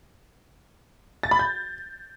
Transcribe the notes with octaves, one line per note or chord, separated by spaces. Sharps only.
A6
B5
G6